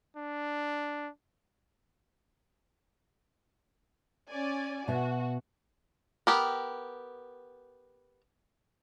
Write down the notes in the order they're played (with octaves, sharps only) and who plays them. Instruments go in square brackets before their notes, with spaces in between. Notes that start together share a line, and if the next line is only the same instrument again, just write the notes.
[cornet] D4
[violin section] C#4 D5 G#5
[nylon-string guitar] B2 E5 [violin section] F#4
[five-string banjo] B3 G4 A#4